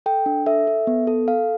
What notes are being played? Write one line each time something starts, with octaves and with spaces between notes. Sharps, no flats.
A4 G5
D4
A4 E5
A4
B3
A4
A4 F5